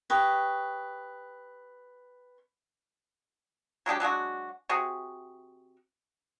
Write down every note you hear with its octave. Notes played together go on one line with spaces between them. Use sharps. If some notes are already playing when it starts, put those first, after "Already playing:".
G4 B4 C#5 D#5
F#3 G#3 D4 G4
F#3 G#3 D4 F#4
C3 F#4 G#4